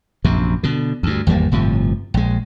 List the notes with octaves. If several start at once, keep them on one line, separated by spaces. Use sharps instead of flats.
A#1 F#2 C3
B2 D3
D2 G2
G#1 E2 G3 A#3
G1 A2 C3 F3
A#1 G#3